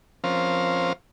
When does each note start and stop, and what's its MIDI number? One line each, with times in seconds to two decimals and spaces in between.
0.24 0.93 53
0.24 0.93 60
0.24 0.93 61
0.24 0.93 70
0.24 0.93 72
0.24 0.93 77